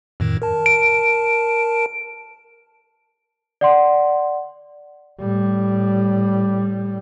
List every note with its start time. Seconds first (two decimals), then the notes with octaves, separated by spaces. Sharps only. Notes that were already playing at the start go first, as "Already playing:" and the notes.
0.20 F2 A2 D#3
0.42 A#4 A5
0.66 D7
3.61 D5 F#5 C6
5.20 A2 G3